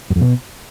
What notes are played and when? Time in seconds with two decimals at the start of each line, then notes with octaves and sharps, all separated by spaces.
0.10 F#2
0.16 F2
0.21 B2